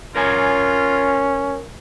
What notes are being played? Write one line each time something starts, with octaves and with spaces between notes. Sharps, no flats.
C#4 F4 A#4 C#5 G#5